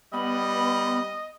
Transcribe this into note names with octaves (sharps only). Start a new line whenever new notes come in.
G3 B3 D#5 B5